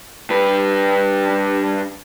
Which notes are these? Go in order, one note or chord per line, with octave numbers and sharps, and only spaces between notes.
G2 B4